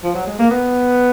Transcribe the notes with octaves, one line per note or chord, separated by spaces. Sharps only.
F3
F#3
G#3
A#3
B3